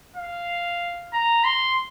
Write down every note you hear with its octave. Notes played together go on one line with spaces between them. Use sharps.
F5
A#5
C6